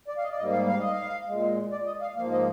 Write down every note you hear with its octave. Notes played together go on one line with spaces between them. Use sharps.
D5
F5
D#5
D5
G#2 G3 A#3 D#5
F5
F5
D#5
F5
A#2 G#3
D5
D#5
F5
G#2 F3 A#3 F5
D#5